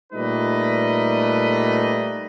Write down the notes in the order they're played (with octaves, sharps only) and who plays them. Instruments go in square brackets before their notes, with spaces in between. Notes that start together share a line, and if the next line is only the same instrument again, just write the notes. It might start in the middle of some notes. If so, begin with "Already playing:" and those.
[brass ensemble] A#2 G3 A3 D#4 B4 D#5